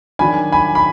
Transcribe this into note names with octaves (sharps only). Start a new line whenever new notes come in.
D#3 F#3 D4 G#5 B5
G#5 B5
B5